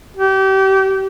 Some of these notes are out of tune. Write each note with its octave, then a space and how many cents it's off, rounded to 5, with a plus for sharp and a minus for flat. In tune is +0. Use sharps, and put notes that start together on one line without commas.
G4 -30